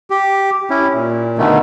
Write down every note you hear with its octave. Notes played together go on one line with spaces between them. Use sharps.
G4
C#4 E4
A#2
B2 D3 D#3 A3